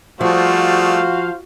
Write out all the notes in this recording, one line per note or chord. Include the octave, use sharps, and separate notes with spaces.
F3 G3 A3 F#4 G#4 C5 F5